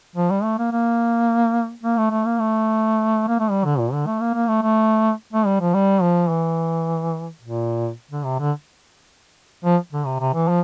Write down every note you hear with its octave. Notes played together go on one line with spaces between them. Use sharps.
F3
G3
A3
A#3
A#3
A#3
A3
A3
A#3
A3
A#3
A3
G3
D3
A#2
D3
A3
A#3
A#3
A3
A3
A3
G3
F3
G3
F3
E3
A#2
D3
C3
D3
F3
D3
C3
C3
E3
F3